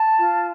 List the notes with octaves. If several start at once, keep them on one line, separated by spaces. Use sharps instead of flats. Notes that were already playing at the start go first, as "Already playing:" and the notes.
Already playing: A5
F4